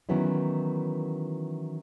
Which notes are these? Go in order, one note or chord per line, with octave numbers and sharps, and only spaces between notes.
D#3 E3 F#3 B3 C#4 E4